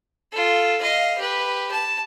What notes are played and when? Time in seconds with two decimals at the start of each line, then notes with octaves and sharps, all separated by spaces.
0.32 F4 A4
0.81 D#5 F5
1.18 G4 B4
1.72 A5